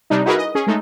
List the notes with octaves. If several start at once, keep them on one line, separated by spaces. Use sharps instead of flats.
C3 G3 D4 D#4
D#4 E4 F#4 G#4 A#4 B4
D#5
C#4 G#4
G#3 A3 D#4